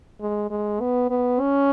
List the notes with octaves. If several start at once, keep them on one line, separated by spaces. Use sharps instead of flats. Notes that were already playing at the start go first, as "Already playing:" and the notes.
G#3
G#3
B3
B3
C#4